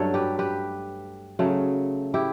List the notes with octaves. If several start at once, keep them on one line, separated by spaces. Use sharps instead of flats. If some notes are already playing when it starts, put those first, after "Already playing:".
Already playing: G2 F#3 A3 A4 C#5
G4 B4
G4 B4
C#3 F#3 A3
E4 G4